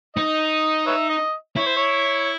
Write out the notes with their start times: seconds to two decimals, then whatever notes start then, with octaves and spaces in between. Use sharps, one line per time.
0.16 D#4 D#5
0.87 B4 C#5 E5
1.10 D#5
1.56 E4 C#5
1.66 C5
1.77 C#5